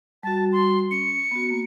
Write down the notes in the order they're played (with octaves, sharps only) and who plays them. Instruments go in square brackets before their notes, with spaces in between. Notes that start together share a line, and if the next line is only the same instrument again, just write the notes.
[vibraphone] G3 F#4 [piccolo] A5
[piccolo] C6
[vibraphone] C#4 [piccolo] C#7
[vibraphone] B3 F#4
A#3